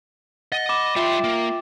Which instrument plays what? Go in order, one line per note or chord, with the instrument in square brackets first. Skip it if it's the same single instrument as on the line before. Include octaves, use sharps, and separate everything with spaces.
[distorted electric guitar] D#5 [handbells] F#5 [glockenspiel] A6
[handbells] B5 [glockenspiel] D6 E7
[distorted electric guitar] G3 C6 [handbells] F4 E5 G5
[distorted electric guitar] A#3